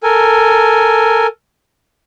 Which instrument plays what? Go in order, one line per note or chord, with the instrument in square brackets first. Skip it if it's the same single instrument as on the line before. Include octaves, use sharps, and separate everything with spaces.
[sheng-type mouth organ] A4 A#4 G#5